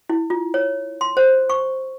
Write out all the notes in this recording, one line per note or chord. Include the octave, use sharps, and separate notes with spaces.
E4
F4
C#5
C6
C5
C#6